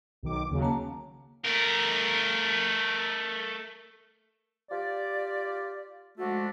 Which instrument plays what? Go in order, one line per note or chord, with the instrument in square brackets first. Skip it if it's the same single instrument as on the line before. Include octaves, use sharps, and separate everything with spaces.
[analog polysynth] B1 D#3 D6
D#2 C#3 F#3
[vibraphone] A#3 A5
[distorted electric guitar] A3 A#4
[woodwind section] F4 G4 D5
F3 G#3 A3 D4 F#4